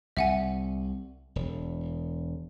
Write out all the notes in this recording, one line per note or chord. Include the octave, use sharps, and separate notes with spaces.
C2 E5 F#5 G#5
E1